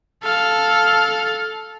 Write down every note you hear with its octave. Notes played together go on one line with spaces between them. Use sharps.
A4 F5